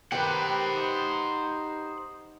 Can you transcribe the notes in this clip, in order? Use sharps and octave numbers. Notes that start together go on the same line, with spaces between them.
D#3 G4 B4 C5 F#5
D#4